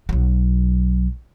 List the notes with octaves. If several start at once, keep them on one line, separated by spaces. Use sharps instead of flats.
B1 F#3